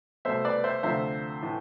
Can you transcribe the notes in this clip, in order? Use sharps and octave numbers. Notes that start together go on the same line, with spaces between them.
C2 B2 A3 C5 E5
B4 D5
C5 E5
D2 C3 F3 A3 C5 E5
A2 E3 A3